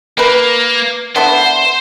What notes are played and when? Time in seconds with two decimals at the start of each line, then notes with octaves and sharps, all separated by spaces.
0.18 A#3 A#4 B4
1.16 D3 B3 E4 C5